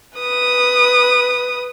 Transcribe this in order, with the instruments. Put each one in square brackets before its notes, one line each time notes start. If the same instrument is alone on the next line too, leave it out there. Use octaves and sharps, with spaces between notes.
[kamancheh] B4 D#6